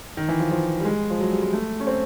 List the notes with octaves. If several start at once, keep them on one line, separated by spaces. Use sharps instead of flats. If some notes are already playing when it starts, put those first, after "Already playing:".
D#3
E3
F3
F3
G3
G#3
F3
F#3
G3
G#3
A3
C#4
C4